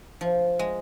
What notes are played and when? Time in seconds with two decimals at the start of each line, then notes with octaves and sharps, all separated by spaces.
0.21 F3
0.59 G#3